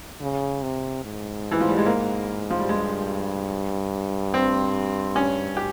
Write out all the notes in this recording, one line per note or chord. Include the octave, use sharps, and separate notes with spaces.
C#3
C3
G#2
E3
F3
G3
G#3
A#3
F3
G3
G2 G#3
C4
C#4
G4